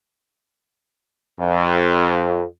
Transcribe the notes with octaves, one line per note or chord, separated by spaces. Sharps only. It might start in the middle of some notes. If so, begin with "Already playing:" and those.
F2